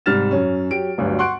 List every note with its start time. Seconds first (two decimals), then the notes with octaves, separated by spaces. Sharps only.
0.06 G#2 C3 G3 F6 A6 E7
0.31 F#2 C#4
0.71 F#3 G4 D7
0.98 G1 D2 G2 F#3
1.19 F#5 C6 C#6 F#6 D7